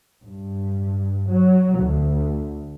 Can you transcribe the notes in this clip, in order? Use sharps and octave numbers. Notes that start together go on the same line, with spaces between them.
G2
F#3
D2